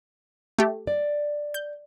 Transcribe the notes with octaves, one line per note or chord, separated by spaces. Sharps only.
A3 G4
D5
G6